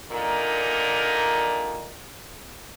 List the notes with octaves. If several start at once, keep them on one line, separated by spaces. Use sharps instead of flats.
A#2 D3 D#4 A#4